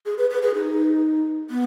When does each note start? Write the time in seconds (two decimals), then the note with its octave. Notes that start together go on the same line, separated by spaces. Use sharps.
0.06 G#4
0.18 B4
0.30 B4
0.42 G#4
0.55 D#4
1.50 B3